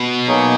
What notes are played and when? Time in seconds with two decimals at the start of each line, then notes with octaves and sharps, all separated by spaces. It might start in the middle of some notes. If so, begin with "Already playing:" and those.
Already playing: B2
0.26 F#3 A#3 D#4 G#4 C#5